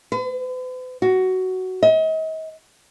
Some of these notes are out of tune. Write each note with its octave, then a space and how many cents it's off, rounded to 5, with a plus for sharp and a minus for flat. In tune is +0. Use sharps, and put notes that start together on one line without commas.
B4 +45
F#4 +10
D#5 +40